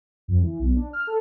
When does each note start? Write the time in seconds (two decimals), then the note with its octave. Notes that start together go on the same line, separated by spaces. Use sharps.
0.28 F2
0.42 E3
0.59 B1
0.76 D4
0.93 F6
1.07 A4